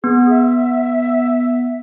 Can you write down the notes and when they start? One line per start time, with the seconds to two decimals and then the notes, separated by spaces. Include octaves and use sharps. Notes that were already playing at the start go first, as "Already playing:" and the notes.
0.04 B3 G#4
0.30 E5